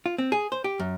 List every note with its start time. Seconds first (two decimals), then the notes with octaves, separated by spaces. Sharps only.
0.06 F4
0.18 C4
0.32 G#4
0.52 C5
0.64 G4
0.80 F#2